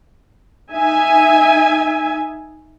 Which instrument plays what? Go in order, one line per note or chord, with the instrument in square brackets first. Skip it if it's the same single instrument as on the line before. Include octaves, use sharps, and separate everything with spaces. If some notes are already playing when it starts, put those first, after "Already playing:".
[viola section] D#4 E5 G#5